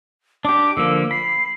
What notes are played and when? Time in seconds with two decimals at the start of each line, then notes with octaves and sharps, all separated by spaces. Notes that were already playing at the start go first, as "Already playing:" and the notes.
0.45 D4 G4 D6
0.77 D3 F3 A#3 E6
1.11 B5 C7